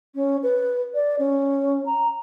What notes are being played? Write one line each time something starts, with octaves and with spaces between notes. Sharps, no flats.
C#4
B4
D5
C#4
A#5